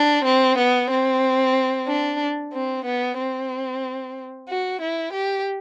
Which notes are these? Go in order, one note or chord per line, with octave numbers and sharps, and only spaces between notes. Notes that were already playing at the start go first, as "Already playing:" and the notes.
Already playing: D4
C4
B3
C4
D4
C4
B3
C4
F#4
E4
G4